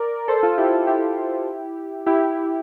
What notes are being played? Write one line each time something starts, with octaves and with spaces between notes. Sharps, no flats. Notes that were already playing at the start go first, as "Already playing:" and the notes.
Already playing: A#4 D5
A4 C5
F4 A4
E4 G4
F4 A4
E4 G4
E4 G4